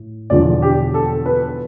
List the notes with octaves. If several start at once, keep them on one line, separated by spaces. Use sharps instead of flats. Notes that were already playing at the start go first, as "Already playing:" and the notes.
Already playing: A2
E1 E2 D3 F3 D5
G4
A4
B4